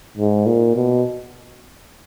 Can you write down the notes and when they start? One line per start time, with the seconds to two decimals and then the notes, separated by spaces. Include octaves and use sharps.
0.18 G#2
0.46 A#2
0.76 B2